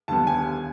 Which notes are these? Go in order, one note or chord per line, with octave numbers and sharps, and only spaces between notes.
D#2 D3 G3 B3 A5
G#5